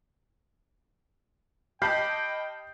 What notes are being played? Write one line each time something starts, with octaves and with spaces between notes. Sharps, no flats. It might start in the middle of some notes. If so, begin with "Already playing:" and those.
G4 D#5 G5 A5 B5 F6 G6 C7